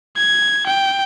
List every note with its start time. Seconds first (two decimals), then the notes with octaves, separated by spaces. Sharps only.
0.17 G#6
0.66 G5